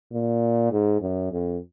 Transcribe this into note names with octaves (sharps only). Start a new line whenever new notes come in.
A#2
G#2
F#2
F2